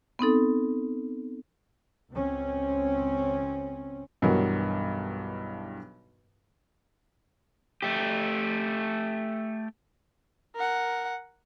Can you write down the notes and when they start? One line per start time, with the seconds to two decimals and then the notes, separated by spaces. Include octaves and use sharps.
0.19 B3 C4 D#4 A4
2.11 C#2 C4 C#4
4.22 B1 G2 E3 F#4 A#4 C#5
7.82 A3 G4
10.55 A#4 F#5